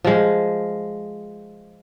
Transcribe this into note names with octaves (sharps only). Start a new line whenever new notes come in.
F3 G#3